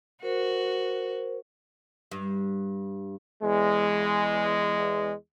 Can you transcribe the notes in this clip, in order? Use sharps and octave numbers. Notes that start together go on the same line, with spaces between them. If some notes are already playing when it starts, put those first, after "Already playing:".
F#4 A#4 C5
G2
E2 G#3